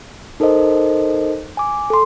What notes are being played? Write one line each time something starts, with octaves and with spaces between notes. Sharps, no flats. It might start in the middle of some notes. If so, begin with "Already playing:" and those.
D#4 A4 A#4 C5 D#5
G#5 D6
A4 C6